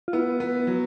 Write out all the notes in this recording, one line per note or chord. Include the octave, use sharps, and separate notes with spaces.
F4
B3 E4
B3
F#3